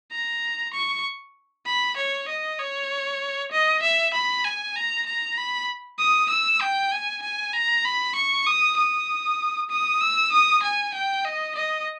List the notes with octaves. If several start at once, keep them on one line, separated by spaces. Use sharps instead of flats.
A#5
C#6
B5
C#5
D#5
C#5
D#5
E5
B5
G#5
A#5
A#5
B5
D#6
E6
G5
G#5
G#5
A#5
B5
C#6
D#6
D#6
D#6
E6
D#6
G#5
G5
D#5
D#5